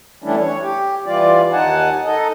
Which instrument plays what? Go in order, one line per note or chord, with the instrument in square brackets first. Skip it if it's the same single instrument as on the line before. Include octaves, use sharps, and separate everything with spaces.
[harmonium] E3 G3 A3 C#4 D4 E4
C#5
G4
E3 G3 F4 D5
D#2 D#4 F#5 G#5 A5
D#4 A4 D#5